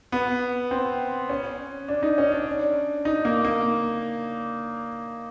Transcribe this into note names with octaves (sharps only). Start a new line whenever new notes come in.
B3
C4
C#4
D4
D#4
C#4
D4
D#4
A#3
A#3